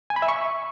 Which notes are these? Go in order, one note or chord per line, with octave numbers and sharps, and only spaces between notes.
G#5
B5
E5
C#6